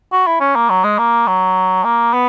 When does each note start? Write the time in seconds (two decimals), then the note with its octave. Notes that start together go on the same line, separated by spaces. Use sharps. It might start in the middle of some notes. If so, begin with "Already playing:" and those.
0.13 F#4
0.27 E4
0.41 C#4
0.56 A#3
0.70 F#3
0.84 G#3
0.99 A#3
1.27 F#3
1.84 A#3
2.13 B3